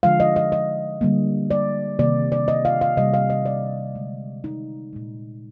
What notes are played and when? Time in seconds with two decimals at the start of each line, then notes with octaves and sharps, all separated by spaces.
0.03 D3 F3 G#3 F5
0.20 D#5
0.36 D#5
0.52 D#5
1.01 D3 G3 A#3
1.51 D5
1.99 C3 D#3 A#3 D5
2.32 D5
2.48 D#5
2.65 F5
2.81 F5
2.97 C3 G3 A#3 D#5
3.14 F5
3.30 D#5
3.46 D5
3.95 D3 G#3
4.44 D#4
4.93 A#2 G#3